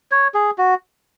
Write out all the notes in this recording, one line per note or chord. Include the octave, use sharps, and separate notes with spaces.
C#5
G#4
F#4